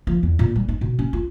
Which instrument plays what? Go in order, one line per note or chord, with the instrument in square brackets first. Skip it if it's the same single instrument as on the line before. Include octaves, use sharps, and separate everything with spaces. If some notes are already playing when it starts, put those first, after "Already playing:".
[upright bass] F3
E2
A#2
G3
D#4
B2
C#4
F4